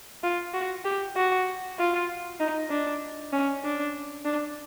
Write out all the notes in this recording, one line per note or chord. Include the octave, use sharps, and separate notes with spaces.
F4
F#4
G4
F#4
F4
D#4
D4
C#4
D4
D4